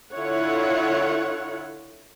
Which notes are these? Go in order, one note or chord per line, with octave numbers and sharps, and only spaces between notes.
D3 E4 F4 C#5 F#5